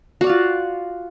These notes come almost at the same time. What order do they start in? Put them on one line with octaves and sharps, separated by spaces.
F#4 D5 F5 F4